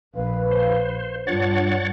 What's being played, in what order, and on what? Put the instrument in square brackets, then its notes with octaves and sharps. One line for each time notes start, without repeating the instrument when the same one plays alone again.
[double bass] A#1 [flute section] B4 F5
[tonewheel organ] C5
[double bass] G2 [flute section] D4 F4 [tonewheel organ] C#5 F#5 A6